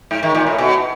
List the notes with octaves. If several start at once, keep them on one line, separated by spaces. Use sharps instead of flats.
G#2
D#3
A#2
A2
B2